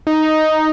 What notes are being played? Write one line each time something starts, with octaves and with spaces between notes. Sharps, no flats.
D#4